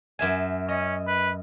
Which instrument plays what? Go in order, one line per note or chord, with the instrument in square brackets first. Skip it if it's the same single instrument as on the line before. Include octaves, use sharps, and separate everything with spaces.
[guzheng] F#2 E5 G#5
[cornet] C#4 [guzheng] D#5
[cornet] B4